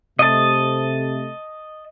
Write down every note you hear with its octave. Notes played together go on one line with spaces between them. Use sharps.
C3 A3 D#5 A5